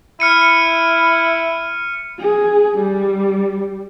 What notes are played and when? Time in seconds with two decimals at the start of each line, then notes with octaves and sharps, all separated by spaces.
0.20 E4 F6 C#7 D#7
2.20 G#4
2.78 G3